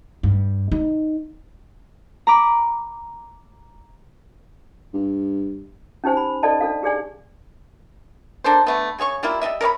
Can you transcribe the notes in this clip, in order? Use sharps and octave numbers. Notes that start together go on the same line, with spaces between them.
G2
D#4
A#5 B5 D6
G2
C#4 D#4 G4 C5 G#5
B5
D#4 A4 D5 D#5 G5 A5
D4 A4 F5
G4 G#4 D5 G#5
A#3 D4 A4 C5
D3 A3 B3
C#3 G#4 C#5 C#6
G3 A#3 E4 F4
G3 D#4 D#5 E5
A#4 C#5 D5 B5